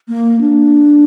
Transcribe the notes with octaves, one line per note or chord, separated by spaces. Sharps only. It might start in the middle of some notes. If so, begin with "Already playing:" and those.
A#3
D4